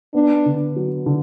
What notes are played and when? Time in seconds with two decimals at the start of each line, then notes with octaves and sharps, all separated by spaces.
0.14 B3 D4
0.46 D3
0.76 F#3
1.06 D3